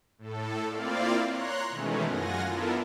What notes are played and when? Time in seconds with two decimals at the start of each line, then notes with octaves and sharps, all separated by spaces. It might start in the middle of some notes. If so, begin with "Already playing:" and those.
0.18 A2 A4
0.69 A#3 C4 E4 F4 D5 F5
1.26 C#5 A#5 C6 F#6
1.70 B2 D#3 E3 G#3 A3 C#4
2.06 F#2 F4 F#5 G#5 A#6
2.46 B3 D4 E4 F4 A4 A#4